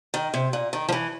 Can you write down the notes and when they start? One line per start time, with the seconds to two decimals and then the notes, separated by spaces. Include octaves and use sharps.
0.14 D#3
0.34 C3
0.53 A#2
0.73 D#3
0.89 F3
0.92 E3